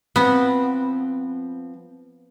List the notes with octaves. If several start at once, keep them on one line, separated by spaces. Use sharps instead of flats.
F3 B3 C4